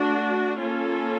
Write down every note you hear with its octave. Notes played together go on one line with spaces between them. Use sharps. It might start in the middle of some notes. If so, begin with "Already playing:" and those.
Already playing: A3 D4 F#4
A#3 C#4 F4 A4